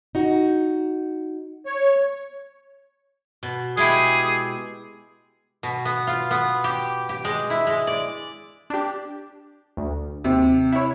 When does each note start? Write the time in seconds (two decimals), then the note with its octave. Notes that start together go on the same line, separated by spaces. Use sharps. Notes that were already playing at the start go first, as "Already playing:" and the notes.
0.15 D#4 F#4
1.66 C#5
3.43 B2
3.77 G#3 E4 G4 G#4
5.63 B2
5.85 B3
6.07 F4
6.31 B3
6.64 G4
7.09 G4
7.25 G#3
7.50 E4
7.67 G#3
7.87 D5
8.70 D4 G4
9.77 D2
10.24 D#2 C3
10.72 E4 C#5